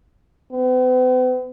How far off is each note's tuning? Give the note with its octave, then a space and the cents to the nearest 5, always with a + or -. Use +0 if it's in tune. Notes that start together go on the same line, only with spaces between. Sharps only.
B3 +45